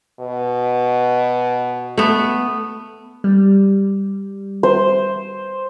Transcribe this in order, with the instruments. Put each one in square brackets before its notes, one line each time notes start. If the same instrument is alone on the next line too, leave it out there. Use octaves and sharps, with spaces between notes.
[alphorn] B2
[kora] A3 B3
[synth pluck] G3
[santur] C5